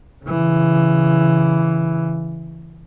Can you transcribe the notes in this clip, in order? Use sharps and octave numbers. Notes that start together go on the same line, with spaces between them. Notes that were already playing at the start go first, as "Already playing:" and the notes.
C#3 E3